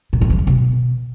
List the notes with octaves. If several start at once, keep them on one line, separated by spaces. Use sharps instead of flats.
A#2
F2
E3
F3
B2